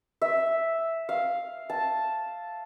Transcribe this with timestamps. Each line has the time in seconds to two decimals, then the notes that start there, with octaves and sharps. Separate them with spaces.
0.22 E5
1.09 F5
1.70 A5